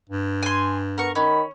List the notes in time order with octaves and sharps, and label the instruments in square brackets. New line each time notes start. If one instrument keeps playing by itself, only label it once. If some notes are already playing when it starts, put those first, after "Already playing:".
[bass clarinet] G2
[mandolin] G#5 C6
[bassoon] B3 [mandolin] A#4 C#6
[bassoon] D#3 [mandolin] C#4 [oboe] B5